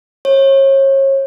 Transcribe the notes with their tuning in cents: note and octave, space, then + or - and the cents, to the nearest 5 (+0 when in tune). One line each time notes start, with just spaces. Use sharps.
C#5 -35